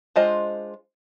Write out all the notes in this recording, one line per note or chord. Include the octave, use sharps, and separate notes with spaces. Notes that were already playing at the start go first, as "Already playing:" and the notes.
G#3 D4 F4 C5 D#5